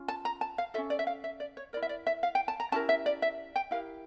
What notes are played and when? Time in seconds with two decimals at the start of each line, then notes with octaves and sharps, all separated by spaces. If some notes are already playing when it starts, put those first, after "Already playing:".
Already playing: C#4 F4
0.08 A5
0.25 A#5
0.41 A5
0.58 F5
0.74 C#4 F4 A4 E5
0.90 D5
0.99 E5
1.07 F5
1.24 E5
1.40 D5
1.57 C#5
1.73 E4 A#4 D5
1.83 E5
1.89 D5
2.07 E5
2.23 F5
2.35 G5
2.48 A5
2.60 A#5
2.72 C#4 E4 G4 A#4 A5
2.89 E5
3.06 D5
3.22 E5
3.56 G5
3.71 E4 G4 A#4 F5